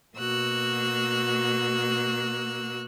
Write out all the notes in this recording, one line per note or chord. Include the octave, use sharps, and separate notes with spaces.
B2 A#3 F#4 E6 F#6